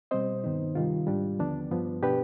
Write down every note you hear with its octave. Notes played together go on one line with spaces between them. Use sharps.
B2 G3 C4 C5 D#5
G2 D#3 B3 D#4
C3 D#3 G3 F4
G#2 G3 D4
D#2 D3 F3 B3 D4
G2 F3 B3
B2 B3 D4 G4 B4